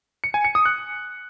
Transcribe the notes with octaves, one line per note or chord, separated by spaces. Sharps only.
C#7
G#5
C#7
D#6
F#6